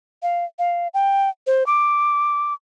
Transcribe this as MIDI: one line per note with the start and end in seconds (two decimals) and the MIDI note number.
0.23 0.45 77
0.59 0.88 77
0.94 1.30 79
1.47 1.66 72
1.66 2.53 86